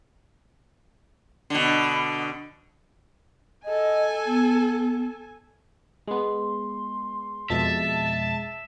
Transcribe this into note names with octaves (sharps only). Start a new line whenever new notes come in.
B2 D3
A4 D#5 G#5
B3
G#3 B3 C6
F2 B2 G#3 E5 A5